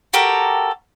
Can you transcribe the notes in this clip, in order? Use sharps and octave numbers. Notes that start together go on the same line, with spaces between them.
F#4 G4 A4 A#4